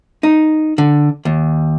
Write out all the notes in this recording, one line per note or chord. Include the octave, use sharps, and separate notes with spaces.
D#4
D3
D#2